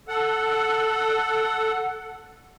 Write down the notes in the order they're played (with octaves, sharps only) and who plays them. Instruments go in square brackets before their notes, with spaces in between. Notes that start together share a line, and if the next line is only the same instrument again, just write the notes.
[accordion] A4 F#5